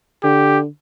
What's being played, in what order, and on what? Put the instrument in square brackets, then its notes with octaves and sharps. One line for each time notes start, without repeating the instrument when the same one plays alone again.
[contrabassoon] D3 [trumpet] G4